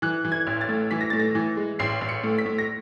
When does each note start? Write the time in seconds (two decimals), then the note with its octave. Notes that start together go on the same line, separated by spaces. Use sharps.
0.02 E3 F#6
0.24 E3
0.32 G#6
0.47 A1
0.61 A6
0.69 A2
0.91 E3 B6
1.01 A#6
1.10 A2 A6
1.20 A#6
1.35 E3
1.57 G#3
1.79 A1 C7
2.01 A1
2.09 C#7
2.23 A2
2.38 B6
2.45 A2
2.58 A#6